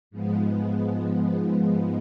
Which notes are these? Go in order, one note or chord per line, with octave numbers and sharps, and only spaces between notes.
G#2 F3 G#3 B3